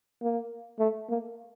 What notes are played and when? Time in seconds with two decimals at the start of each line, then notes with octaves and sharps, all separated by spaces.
0.22 A#3
0.79 A3
1.09 A#3